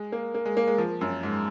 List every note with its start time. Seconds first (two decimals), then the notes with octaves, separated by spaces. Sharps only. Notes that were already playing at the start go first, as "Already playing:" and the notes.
Already playing: G#3
0.12 A#3
0.34 A#3
0.45 G#3
0.57 A#3
0.67 G#3
0.78 F3
1.01 F#2
1.23 G#2